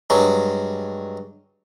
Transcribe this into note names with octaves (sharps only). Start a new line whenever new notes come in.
G2 F#3 G#3